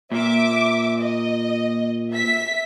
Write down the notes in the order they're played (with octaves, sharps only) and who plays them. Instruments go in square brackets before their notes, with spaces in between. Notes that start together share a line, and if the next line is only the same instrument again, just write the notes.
[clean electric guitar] A#2 [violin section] E5 D6
[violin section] D#5
E5 B6